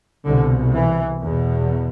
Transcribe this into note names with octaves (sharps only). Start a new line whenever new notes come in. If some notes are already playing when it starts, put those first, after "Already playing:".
C2 B2 D3
E3
E2 B2